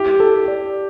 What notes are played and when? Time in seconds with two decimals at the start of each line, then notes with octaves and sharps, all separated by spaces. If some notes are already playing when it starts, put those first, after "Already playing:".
Already playing: E4 G4
0.20 A4
0.48 D5